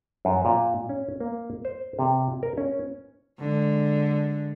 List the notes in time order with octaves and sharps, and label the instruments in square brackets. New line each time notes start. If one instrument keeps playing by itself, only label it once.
[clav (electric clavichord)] F#2
A#2
C#4
A#3
C5
C3
A#4
C#4
[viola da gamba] D3 G#3